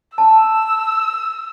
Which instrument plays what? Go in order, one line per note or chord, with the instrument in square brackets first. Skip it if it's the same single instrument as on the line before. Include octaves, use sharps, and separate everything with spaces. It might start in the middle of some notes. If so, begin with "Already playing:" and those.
[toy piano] A5 [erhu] E6